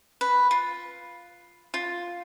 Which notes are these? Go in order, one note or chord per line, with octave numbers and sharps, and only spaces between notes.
B4
F4
F4